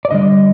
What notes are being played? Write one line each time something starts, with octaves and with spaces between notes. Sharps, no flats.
D5
D3 G3 D#5